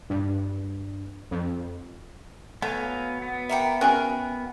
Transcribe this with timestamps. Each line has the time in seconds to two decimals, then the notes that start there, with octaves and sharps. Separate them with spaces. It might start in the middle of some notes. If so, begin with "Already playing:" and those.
0.10 G2
1.31 F2
2.62 F#3 A3 B3 F5 G#5
3.22 B3
3.49 A#3 E5 F#5 G5 A#5 C#7
3.81 C#4 F#4 G#4 A#4 G5 G#5 F#6